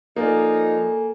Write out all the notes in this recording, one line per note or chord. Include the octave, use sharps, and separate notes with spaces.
F3 A#3 D#4 A4 D5 G#5